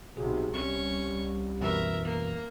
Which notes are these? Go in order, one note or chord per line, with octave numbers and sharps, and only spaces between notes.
B1 C3 F#4 G#4
C2 G3 C4 C#4 C#6
F#2 B2 E3 A#4 E5
A#3